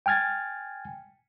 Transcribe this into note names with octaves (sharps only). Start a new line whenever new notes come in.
G5 G#5 F6 G#6 A6